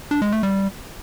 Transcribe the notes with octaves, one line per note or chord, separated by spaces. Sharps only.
D4
G#3
A3
G3